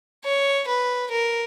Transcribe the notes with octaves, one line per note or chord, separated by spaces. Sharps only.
C#5
B4
A#4